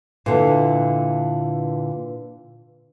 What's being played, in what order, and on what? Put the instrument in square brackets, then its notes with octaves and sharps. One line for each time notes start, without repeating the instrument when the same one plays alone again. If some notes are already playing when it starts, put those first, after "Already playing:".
[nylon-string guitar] A#2 D3 E3